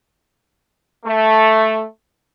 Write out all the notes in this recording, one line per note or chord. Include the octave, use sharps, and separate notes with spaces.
A3